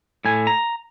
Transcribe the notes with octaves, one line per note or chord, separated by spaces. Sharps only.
A2 G#5
A#5